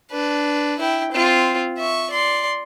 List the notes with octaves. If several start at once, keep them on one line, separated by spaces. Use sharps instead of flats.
D4 B4
E4 G5
C4 F4
E5 C#6
D5 C6